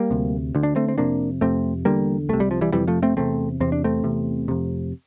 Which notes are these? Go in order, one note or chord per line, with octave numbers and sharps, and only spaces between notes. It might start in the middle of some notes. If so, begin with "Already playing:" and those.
Already playing: G3 A#3
D2 C3
D2 D3
D4
A3 C4
C4
F2 C3 A#3 D4
F2 C3 A3 C4
E2 D3 G3 A#3
C2 C3 A3
G3
F3
E3 G3
F2 C3 E3 G3
F3 A3
A3 C4
E2 C3 A3 C4
E2 C3 C4
D4
A3 C4
E2 C3
F2 C3